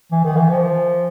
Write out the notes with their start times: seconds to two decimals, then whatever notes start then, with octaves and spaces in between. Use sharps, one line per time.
0.12 E3
0.25 D#3
0.36 E3
0.50 F3